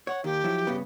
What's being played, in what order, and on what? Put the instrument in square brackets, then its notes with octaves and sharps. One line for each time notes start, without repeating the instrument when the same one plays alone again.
[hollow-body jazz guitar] C#5 [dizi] F#5
[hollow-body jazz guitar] D#2 D#3 [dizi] G4
[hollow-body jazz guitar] F3 F#3 E4
G2 C#3 B3